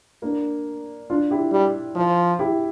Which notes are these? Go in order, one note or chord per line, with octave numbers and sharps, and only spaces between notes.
A#3 D4
D4 F4
E4 G4
G3
F3
E4 G4